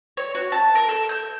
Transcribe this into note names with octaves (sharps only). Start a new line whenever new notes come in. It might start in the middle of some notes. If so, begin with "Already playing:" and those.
C#5
F#4
A5
A#4
A4
G6